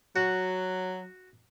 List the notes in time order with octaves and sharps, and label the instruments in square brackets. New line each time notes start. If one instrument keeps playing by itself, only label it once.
[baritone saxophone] F#3 [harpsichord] F#4